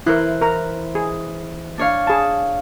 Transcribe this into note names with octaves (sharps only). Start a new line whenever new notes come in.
E3 E4 A#4 C5 F#6
A#4 A#5
G#4
D4 C#5 F5
G#4 A5